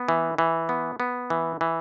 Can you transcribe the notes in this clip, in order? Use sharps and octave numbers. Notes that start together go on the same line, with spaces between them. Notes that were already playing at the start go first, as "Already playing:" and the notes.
Already playing: B3
E3
E3
B3
B3
E3
E3